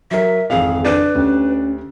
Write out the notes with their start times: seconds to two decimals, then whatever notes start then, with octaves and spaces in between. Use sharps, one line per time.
0.11 F#3 A#4 E5
0.50 G#1 F2 E3 G#4 F5
0.85 D4 B4
1.15 D2 C#4 G4